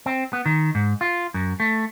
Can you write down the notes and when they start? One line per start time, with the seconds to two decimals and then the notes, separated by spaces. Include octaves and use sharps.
0.06 C4
0.33 B3
0.46 D#3
0.75 G#2
1.01 F4
1.34 F#2
1.60 A3